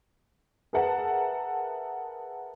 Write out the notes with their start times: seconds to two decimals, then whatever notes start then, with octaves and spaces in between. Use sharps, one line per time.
0.73 G#4 A#4 B4 E5 F#5 A5